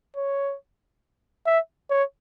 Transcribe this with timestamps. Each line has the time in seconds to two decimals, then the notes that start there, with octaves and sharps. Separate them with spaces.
0.16 C#5
1.46 E5
1.90 C#5